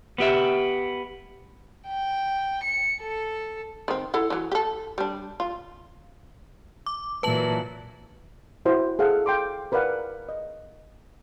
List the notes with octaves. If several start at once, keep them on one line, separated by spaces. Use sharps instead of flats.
B3 G4 E5
G5
C#7
A4
D#3 C4
E4 A4 F#5
E3 F#3
G4 A4
G3 D4
F4
D6
A#2 E3 F#3 B4 A5 F#7
E4 F#4 C5 C6
G#4 A4 F5 F#5
F5 G5 C6 D6
A#4 B4 D5 F5 F#5
D#5